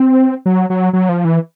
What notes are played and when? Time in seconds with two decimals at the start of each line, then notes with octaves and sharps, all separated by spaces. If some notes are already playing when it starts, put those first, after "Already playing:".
Already playing: C4
0.46 F#3
0.70 F#3
0.93 F#3
1.09 F3
1.25 E3